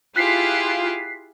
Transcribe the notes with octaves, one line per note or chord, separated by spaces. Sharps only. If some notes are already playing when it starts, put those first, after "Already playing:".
E4 F4 G4 G#4 F#6 B6 C7